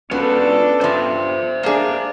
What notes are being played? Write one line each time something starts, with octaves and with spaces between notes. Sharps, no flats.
F#3 B3 C#4 D4 F4 A4 B4
G2 F3 C5 E5
A#3 D4 G#4